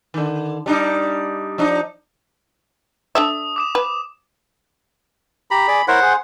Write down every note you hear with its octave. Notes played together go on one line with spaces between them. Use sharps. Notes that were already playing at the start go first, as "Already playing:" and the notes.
D3 D#3
G3 D4 D#4
F3 D4 D#4
D4 A4 E5 D#6
D6 D#6 E7
B4
G4 A#5 B5
G#4 D5
E4 A#4 C5 C#5 F#5
G#4